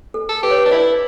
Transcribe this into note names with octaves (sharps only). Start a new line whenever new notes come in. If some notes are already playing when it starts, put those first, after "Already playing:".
A4
A4
G4 B4
C#5
B4
D4
E4 B4 D5